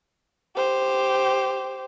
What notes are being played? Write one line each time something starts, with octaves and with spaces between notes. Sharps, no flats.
G4 C5